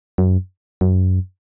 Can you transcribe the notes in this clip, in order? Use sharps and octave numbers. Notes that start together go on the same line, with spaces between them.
F#2
F#2